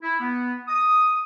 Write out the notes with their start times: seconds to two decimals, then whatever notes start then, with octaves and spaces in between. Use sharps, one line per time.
0.02 E4
0.20 B3
0.68 D#6